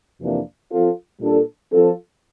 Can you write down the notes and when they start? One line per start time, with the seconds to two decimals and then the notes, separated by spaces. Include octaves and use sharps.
0.21 F2 C3 E3 A#3 D4
0.71 F3 C4 F4 A4
1.21 A#2 G3 D4 A4
1.71 F3 C4 F4 A4